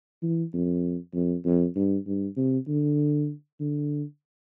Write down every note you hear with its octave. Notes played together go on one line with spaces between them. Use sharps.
E3
F2
F2
F2
G2
G2
C3
D3
D3